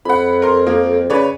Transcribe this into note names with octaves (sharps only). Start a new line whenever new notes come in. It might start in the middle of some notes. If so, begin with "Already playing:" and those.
F2 F#5 B5
A#4 C6
F3 A#3
C#3 B4 C#5 D5